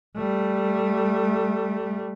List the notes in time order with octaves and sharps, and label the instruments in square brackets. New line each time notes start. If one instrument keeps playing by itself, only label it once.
[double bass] G3 A3